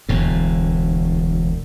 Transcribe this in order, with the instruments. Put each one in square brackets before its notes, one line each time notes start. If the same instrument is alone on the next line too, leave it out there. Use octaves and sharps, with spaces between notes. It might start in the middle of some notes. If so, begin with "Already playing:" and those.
[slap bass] E1 D2 A2